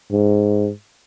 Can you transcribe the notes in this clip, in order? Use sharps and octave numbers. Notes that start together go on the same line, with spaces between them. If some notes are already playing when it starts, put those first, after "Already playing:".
G#2